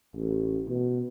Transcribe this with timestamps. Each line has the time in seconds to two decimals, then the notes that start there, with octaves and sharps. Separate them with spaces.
0.16 A1
0.68 B2